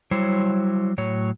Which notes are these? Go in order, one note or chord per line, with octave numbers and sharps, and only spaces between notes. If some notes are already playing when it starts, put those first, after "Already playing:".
F#3 G3 E4 C5 C#5
A2 F#3 C#5